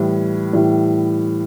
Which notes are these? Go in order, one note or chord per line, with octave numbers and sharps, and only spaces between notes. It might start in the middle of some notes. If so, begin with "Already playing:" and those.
Already playing: A2 E3 G3
A2 E3 G3